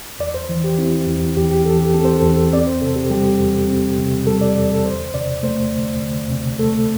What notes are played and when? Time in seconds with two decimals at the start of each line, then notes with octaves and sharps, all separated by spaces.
0.19 E2 D5
0.34 C5
0.49 E3
0.64 G4
0.78 C4 E4
1.07 E2
1.37 E2 G4
1.51 G4
1.65 E3 A4
1.80 G4
1.94 C4 A4
2.05 C5
2.16 A4
2.23 E2
2.52 C4 D5
2.67 C5
2.81 C3 A4
2.96 G4
3.10 G3 G4
3.40 E2
3.68 C4
3.98 C3
4.27 G3 A4
4.41 D5
4.56 E2 D5
4.71 A4
4.85 D2 C5
5.14 C3 D5
5.43 A3 C5
5.73 D2
6.02 D2
6.30 C3
6.59 A3 A4